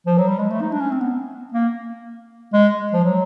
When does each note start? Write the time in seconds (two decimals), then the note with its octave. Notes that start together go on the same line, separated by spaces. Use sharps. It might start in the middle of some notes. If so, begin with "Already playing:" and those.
0.06 F3
0.18 F#3
0.28 G3
0.39 G#3
0.50 A3
0.62 D#4
0.71 D4
0.81 C#4
0.91 C4
1.01 B3
1.52 A#3
2.53 G#3
2.93 F3
3.04 F#3